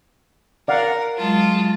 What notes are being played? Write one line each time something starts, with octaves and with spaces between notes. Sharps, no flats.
A#4 D5 F5 F#5
F#3 G#3 F4 A5